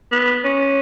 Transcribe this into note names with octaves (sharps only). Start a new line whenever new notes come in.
B3
C#4